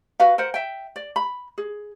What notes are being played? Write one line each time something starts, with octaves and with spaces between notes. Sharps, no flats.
F#4 B4 F5
A#4 C5 F#5
E5 G5
D5
B5
G#4